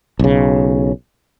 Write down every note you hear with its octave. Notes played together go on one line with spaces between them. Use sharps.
B1 C#3